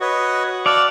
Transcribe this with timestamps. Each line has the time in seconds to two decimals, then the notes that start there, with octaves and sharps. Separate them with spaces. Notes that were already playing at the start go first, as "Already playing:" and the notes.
0.01 F#4 B4 C#5 D#5
0.66 D5 F5 F#5 A5 E6